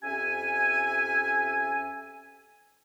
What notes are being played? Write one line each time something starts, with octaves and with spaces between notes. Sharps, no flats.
F2 C#4 G4 E5 G#5